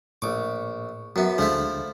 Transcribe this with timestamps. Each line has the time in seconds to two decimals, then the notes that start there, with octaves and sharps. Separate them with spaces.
0.22 A#1 A2 C#6 D6
1.16 F#2 F#3 B3 E5
1.38 D2 D3 F3 G#3 A3 E4